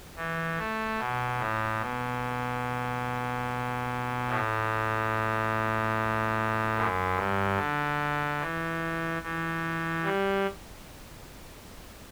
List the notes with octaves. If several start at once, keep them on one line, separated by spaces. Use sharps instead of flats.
E3
A3
B2
A2
B2
A2
F#2
G2
D3
E3
E3
G3